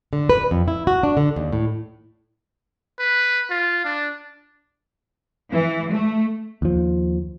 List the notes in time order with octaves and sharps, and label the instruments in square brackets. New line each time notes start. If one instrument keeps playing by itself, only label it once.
[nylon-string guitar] D3
B4
F2
E4
F#4
D4
D3
D#2
A2
[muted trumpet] B4
F4
D4
[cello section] E3
A3
[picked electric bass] D#2 F3